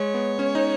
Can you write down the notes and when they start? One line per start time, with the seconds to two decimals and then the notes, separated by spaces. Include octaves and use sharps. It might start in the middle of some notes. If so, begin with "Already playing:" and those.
Already playing: G#3 C#5
0.14 B3
0.39 C#4
0.55 D#4